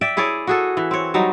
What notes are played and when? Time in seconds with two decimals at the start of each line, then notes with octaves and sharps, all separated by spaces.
0.01 D5 E5 G5
0.17 E4 G#4 C#5 D5
0.47 F#4 G#4 A4
0.77 E3
0.91 C4 C#5
1.14 F#3 G3 D#4